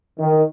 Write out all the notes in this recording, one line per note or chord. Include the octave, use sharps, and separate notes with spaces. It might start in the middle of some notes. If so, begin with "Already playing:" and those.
D#3